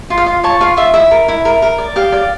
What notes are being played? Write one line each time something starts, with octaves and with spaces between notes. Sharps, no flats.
F4
F5
F4
C#5 A5
F4 F5
F4 E5
E4 E5
A#4
E4
A#4
A#4
D5
G4 F5
D5